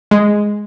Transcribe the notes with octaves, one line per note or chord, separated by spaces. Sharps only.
G#3